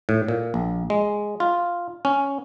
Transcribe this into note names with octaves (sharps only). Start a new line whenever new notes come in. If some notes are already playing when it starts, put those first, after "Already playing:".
A2
A#2
A#1
G#3
F4
C#4